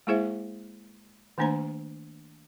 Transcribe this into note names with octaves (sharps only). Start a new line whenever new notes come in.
G#3 A#3 E4 G#4 C5 E5
D#3 A3 A#3 D4 C5 A#5